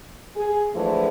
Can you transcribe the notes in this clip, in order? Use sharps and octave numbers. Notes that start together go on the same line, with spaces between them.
G#4
D3 E3 F3 G#3 A3